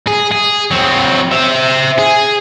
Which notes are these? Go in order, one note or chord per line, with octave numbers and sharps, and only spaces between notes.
G#4
G#4
F#3 C4
C5 E5
G#4